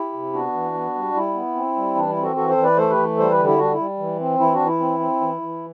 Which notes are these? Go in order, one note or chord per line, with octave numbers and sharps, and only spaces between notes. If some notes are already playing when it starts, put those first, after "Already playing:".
Already playing: E4 G4
C3
B3 D4 F#4
E3
B3
G3
G3 E4
B3
C4
G3
E3 D4
E4
C4
F#4 A4
E3 F#4 A4
A4 C5
E3
B4 D5
A3 A4 C5
G4 B4
E3
G3 A4 C5
G4 B4
D3
E4 G4
G3 D4 F#4
E4
G3
E3
C4
E3 E4
D4 F#4
E3
E4
C4
C4
E3
E3